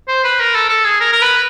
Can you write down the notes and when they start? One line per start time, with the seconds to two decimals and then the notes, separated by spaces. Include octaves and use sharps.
0.08 C5
0.24 B4
0.40 A#4
0.55 A4
0.69 A4
0.85 G#4
1.01 A#4
1.13 A#4
1.21 B4